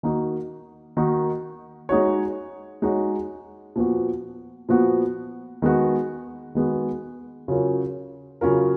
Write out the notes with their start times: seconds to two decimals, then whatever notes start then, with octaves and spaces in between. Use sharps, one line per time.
0.03 D#3 A#3 D#4 F#4
0.97 D#3 A#3 D#4 F#4
1.89 G#3 D#4 F#4 C#5
2.82 G#3 D#4 F#4 C#5
3.76 A#2 F3 B3 F#4
4.69 A#2 F3 B3 F#4
5.62 D#3 G#3 B3 F#4
6.55 D#3 G#3 B3 F#4
7.48 C#3 F#3 C#4 F4 A#4
8.41 C#3 F#3 C#4 F4 A#4